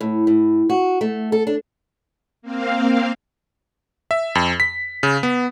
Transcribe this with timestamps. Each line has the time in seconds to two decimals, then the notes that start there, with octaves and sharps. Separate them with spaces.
0.01 A2
0.27 A2
0.70 F#4
1.01 A3
1.32 A4
1.47 D4
2.42 A#3 C4 F5
4.11 E5
4.35 F2
4.60 B6
5.03 C#3
5.23 B3